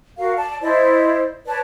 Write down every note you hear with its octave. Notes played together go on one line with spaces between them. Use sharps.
F#4 A#4 F5
D5 A5
E4 C5 D5 D#5
B4 C#5 D5 A5